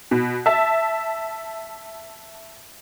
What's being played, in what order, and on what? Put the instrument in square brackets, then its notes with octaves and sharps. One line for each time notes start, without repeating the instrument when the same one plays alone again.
[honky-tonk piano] B2
E5 A5